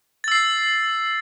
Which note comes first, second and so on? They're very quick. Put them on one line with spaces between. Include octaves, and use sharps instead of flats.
A6 E6 C7